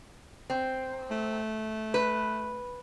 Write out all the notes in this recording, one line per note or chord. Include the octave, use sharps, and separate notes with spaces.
C4
A3
B4